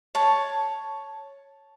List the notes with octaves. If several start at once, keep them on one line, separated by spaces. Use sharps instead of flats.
C#5 A5